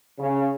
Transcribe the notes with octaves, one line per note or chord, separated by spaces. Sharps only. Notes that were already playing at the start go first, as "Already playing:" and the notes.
C#3